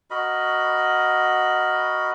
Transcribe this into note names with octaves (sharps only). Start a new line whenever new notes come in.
F#4 A#4 D#5 B5